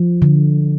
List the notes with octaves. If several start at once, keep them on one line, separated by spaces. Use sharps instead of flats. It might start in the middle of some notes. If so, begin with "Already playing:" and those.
Already playing: F3
D3